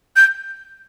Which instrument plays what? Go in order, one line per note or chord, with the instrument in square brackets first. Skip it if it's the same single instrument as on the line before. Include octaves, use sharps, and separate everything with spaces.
[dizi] G6